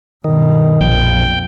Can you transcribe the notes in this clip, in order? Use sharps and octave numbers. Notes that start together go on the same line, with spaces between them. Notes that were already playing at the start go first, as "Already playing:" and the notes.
G2 B2 D#3
A#1 F2 G5